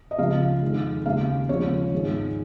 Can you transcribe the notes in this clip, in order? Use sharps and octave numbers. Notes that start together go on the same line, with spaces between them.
D#5
C#2 C#3 F3 F5
F2 D#3 G#3
D#2 C#3 G#3 F5
D#2 C#3 F3 G#3 C#5
G#1 G#2 D#3 G#3